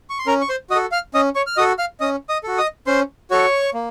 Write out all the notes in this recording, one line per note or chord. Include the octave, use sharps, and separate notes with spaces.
C#6
C6
C#4 A#4 A#5
C#6
C5 C6
F#4 D#5 D#6
A4
F5 F6
C#4 D#5 D#6
C#5 C#6
F6
F#4 A4 D#5 D#6
F5 F6
C#4 D#5 D#6
D#5 D#6
F#4 A4
D#5 D#6
C#4 C5 C6
F#4 A4 C#5 C#6
A#3